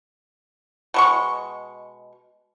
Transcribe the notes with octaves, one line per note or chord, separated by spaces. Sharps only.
B2 G#3 C#6